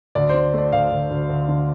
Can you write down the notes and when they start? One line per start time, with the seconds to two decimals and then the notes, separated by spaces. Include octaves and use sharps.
0.15 D2 D5
0.29 D3 C5
0.53 A3 D5
0.72 D2 F5
0.91 D2
1.10 D2
1.30 D2
1.49 D3